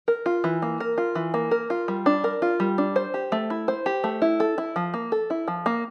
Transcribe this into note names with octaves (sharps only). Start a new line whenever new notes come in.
A#4
F4
E3
A#3
A#4
F4
E3
A#3
A#4
F4
G3
D4
A#4
F4
G3
D4
C5
G4
A3
E4
C5
G4
A3
E4
A4
E4
F3
A#3
A4
E4
F3
A#3